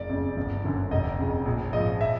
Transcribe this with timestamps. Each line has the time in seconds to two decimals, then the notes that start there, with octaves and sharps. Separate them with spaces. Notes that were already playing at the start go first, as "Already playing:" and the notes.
Already playing: F#1 D5
0.09 F2 C#3
0.37 G1
0.64 F#2 D3
0.91 F1 D#5
1.19 F2 C#3
1.45 A#1
1.73 G#2 F3 D#5
2.01 E5